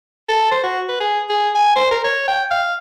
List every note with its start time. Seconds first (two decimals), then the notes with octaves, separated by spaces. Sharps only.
0.29 A4
0.51 C5
0.63 F#4
0.88 B4
1.00 G#4
1.29 G#4
1.55 G#5
1.76 C5
1.91 A#4
2.04 C#5
2.28 G5
2.51 F5